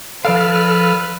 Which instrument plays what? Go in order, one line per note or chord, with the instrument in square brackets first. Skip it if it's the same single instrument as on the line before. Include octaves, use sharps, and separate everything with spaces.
[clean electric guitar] F3 D5 F5 [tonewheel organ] A4 F6 [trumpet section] B4